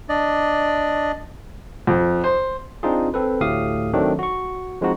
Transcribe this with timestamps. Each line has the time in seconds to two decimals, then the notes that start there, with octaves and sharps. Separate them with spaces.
0.09 D4 D5 D#5
1.87 F2
2.24 C5
2.83 C4 D4 D#4 F4 G#4
3.14 C4 A4 B4
3.41 D2 A2 A3 G4 F5 D#6
3.94 D#3 F#3 A3 C4 D4
4.19 F#4 C#6
4.81 F3 G#3 C4 D#4 F#4